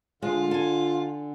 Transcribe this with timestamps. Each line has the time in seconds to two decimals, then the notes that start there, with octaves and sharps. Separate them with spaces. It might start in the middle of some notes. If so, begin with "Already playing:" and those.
0.22 D3 G#3 F4
0.51 A4 G#5